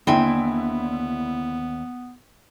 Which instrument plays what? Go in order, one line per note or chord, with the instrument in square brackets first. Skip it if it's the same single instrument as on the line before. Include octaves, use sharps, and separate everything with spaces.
[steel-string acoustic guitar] D#2 [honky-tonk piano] D3 E4 [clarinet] B3 [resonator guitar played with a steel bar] C4 G5 G#5